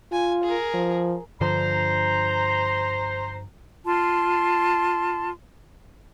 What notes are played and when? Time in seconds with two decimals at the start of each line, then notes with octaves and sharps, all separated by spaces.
0.12 F4 G#5
0.44 G#4 A#4
0.74 F3
1.41 G2 D3 F3 C5 A#5
3.85 F4 A5 C6